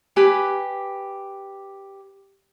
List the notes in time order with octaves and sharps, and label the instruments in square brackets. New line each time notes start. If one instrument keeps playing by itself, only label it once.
[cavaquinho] G4 B4 G#5 D6